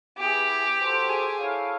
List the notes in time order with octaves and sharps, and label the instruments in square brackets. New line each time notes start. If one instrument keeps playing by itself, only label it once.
[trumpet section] B3 E4 G#4 B4 [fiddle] G4
[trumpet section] F#4 A4 C5
[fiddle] G#4
[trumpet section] E4 A4 C#5 F5